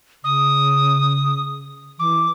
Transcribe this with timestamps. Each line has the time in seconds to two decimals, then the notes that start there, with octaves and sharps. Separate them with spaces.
0.24 C#3 D#6
1.99 E3 D6